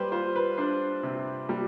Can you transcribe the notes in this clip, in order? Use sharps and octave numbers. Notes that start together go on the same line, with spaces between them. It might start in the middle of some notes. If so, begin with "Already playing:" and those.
Already playing: G3 B4 C5
F4 C5
B4
D4 C5
C3
G3